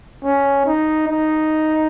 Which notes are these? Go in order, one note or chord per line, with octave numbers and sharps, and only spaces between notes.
C#4
D#4
D#4